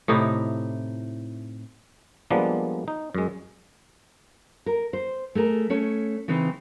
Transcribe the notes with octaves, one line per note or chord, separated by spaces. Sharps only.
A2 C3 D#4 E4
F3 G3 G#3 A#3 B3 D4
D#4
F#2 G#3
A#4
C5
A3 G#4 A#4
A3 C#4 C#5
C#3 E3 C4 D#4